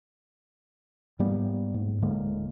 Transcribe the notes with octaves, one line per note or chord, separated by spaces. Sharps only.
G#2 G3 A#3 B3
G#2
D1 D3 G#3 A#3